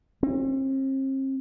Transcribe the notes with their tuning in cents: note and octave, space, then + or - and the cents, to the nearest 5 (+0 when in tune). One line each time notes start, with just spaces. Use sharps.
C4 +40